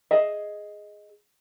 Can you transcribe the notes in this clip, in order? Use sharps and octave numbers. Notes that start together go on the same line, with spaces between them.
G#4 D#5 E5